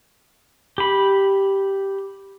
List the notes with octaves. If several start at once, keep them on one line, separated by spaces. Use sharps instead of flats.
G4 B5